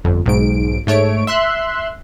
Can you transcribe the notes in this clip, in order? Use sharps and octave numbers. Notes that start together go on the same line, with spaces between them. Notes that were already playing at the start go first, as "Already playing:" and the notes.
G1 F2
B1 G#2 D7
G#2 A3 C#5 D7
E5 C6 F#6